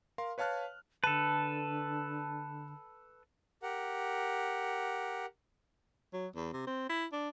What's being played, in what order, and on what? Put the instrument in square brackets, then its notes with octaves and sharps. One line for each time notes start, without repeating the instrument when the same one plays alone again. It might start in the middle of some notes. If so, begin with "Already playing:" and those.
[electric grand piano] A#4 F5 C6
B4 C#5 F5 A5 F6 F#6
[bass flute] D3 [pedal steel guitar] A4 B4 [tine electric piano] A5
[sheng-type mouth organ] G4 A#4 F#5
[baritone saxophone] F#3
E2
C3
C4
E4
D4